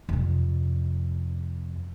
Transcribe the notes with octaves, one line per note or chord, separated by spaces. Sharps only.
F2 C3